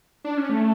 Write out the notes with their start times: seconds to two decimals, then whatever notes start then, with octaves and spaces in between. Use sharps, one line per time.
0.25 D4
0.37 C#4
0.49 A3